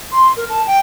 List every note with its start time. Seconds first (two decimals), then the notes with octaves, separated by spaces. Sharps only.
0.12 C6
0.37 A#4
0.49 A5
0.67 G5